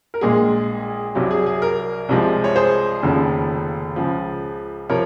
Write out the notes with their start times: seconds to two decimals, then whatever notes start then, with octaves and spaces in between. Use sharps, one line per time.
0.14 A#4
0.21 A#1 A#2 G#3 G#4
1.15 C2 C3 F#3
1.31 G#4
1.46 G#4
1.62 A#4
2.09 C2 C3 F3 G#3
2.44 C#5
2.56 G#4 C5
3.03 F1 D#2 C#3 F3
3.96 C#2 C#3 F3
4.89 C3 F3 A#4 C#5